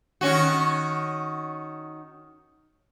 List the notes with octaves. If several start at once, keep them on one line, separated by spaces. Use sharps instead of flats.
D#3 C#4 F#4